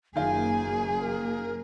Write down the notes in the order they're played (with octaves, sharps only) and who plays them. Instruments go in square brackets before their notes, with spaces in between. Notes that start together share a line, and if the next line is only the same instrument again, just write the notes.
[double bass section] F#1 F#2 A#3 [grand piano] D#3 F4 [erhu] G#4 [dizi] G#5
[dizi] A#4